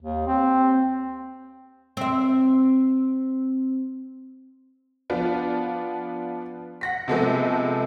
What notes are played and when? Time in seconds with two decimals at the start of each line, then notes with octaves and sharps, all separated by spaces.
0.02 D#2
0.27 C4
1.97 C4 E5
5.10 F3 B3 D4 F4
6.81 F#5 A#6 B6
7.08 C3 F3 G#3 A3 B3